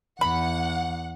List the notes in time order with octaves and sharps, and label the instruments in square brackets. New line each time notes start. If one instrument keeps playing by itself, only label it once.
[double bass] E2 [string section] F#5 [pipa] B5